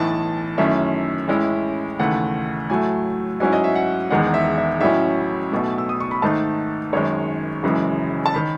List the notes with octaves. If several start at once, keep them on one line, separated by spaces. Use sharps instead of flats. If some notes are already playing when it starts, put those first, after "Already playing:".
Already playing: B1 A2 E3 A5
F#2 D#3 A3 C#4 E4 E5
A1 A2 G#3 C#4 E4
D#2 C#3 E3 A3 F#5
A2 F#3 A3 G#5
G#2 F#3 C#4 E4 G#5
D#5
E5
F#5
E1 E2 D#3 G#3 F#5
E5
E5
A1 A2 F#3 C#4 E4 E5
B1 B2 A3
E6
D#6
C#6
B5
G#2 D#3 A3 D#4 A5
G#1 F#2 D#3 G#3 C#5
F#1 F#2 C#3 E3 G#3
A5
D#3 B5